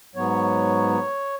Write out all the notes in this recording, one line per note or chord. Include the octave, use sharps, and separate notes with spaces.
G#2 F#3 B3 C#5